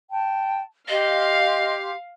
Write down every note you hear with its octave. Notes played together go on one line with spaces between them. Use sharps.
G5 A5
G4 D#5 F5 C6